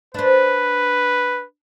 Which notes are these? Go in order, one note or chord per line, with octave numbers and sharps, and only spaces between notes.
D4 B4 C5